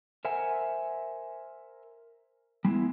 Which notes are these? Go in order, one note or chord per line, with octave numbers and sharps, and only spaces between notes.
A#4 C5 E5 F#5 G#5
G3 G#3 B3 E4